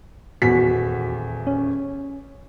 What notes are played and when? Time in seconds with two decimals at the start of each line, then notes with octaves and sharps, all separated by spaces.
0.42 D#1 E2 F#4 B6
1.47 C#4